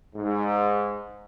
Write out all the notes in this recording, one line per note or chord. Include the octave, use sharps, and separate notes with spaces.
G#2